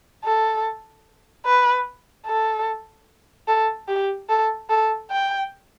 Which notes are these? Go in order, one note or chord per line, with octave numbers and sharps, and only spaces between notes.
A4
B4
A4
A4
G4
A4
A4
G5